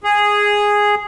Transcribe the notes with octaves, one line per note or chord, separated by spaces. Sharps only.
G#4